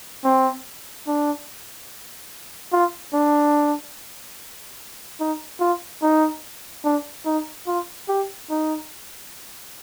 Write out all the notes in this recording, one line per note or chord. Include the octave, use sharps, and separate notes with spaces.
C4
D4
F4
D4
D#4
F4
D#4
D4
D#4
F4
G4
D#4